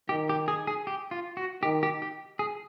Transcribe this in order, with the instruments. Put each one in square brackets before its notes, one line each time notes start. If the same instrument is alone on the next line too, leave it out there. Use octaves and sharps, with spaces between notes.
[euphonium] D#3 [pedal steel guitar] G4
[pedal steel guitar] G4
G#4
G#4
G4
F4
F#4
[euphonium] D#3 [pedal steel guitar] G4
[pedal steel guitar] G4
G4
G#4